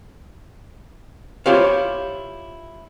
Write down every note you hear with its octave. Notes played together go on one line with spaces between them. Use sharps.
E4 F4 G4 C5 C#5 F5